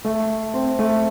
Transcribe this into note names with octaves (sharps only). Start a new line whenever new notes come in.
A3
C4
A3